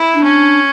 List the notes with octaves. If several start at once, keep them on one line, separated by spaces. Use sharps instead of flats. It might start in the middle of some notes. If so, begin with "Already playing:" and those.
Already playing: E4
D4
C#4